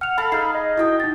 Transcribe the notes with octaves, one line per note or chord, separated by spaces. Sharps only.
F#5 F6 F7
A4 F5 B5
D#4 G#4 F6 C7
D#5
E4 F#4 G5 D#6
D#4 A6